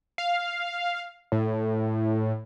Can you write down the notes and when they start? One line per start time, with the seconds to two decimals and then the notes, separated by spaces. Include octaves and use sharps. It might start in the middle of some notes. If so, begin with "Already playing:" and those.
0.18 F5
1.32 A2